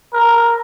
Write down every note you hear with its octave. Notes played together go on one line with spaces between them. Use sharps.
A#4